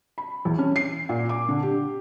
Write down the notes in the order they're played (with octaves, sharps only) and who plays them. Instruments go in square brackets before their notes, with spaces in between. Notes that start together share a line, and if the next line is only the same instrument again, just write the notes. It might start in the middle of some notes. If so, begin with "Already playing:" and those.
[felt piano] B5
E2
C#4
C7
A#2
D6
D3
G4